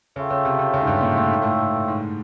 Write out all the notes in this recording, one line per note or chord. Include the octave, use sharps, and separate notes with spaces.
C#3 F4 A4 C#5 E5 G5
C#3
C3
C3
C#3
G#2
G2
A#2
A2
G#2
A2
G#2